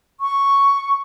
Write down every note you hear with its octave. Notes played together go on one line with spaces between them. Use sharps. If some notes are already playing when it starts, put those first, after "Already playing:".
C#6